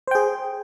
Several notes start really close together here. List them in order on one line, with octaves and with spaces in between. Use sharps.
C5 G5 G#4